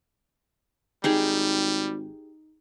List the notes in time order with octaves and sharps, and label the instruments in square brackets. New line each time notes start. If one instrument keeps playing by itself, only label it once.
[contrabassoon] G#1 [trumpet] G3 [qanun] D#4 G4 G#4